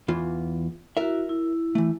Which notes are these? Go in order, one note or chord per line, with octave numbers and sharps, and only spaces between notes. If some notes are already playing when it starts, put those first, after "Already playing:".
E2 E3 F4
E4 F#4 A#4 E5
E4
E3 A3